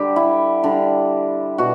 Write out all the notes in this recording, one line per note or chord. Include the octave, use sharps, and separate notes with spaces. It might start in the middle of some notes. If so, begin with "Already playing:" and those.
Already playing: D3 G3 G4
E4
D3 G3
B2 F#4